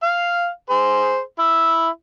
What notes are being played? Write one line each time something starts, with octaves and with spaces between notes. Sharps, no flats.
F5
G#4 C5
E4